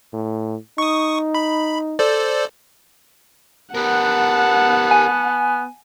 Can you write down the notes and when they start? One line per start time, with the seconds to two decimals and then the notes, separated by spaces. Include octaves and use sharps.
0.13 A2
0.78 D#4 C#6 D#6
1.35 B5
1.99 A4 C5 D5
3.75 B3 G4 A#4 F#5 A5
4.91 G#5